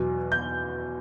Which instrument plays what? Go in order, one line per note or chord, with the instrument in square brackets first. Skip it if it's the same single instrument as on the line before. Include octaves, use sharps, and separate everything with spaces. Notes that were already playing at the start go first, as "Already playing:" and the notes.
Already playing: [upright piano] E2 B2 F#3
G6